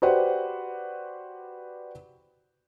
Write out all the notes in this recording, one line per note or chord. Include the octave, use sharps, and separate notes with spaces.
F#4 G4 B4 C5 D5 F#5